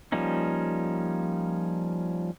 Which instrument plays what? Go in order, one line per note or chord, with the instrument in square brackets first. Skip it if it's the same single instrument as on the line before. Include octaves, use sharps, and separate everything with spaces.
[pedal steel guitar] F3 G3 A#3 C#4 D#4